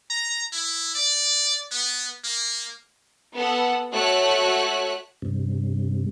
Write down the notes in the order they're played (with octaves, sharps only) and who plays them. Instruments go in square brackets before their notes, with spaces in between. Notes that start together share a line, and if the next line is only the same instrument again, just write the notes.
[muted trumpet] A#5
E4
D5
B3
A#3
[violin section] B3 A4 F#5
A3 F#4 C#5 F#6
[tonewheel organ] G2 C3